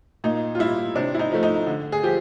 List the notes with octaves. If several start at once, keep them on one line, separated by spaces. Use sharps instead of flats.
A#2 D#4
F4
G3 E4
C3 D4
E4
D#4
F3 A3
D#4
D3
G#4
F3 G4